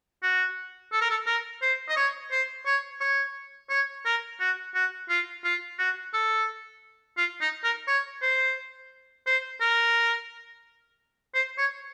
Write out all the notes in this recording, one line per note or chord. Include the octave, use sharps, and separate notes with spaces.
F#4
A4
A#4
A4
A#4
C5
D#5
C#5
C5
C#5
C#5
C#5
A#4
F#4
F#4
F4
F4
F#4
A4
F4
D#4
A#4
C#5
C5
C5
A#4
C5
C#5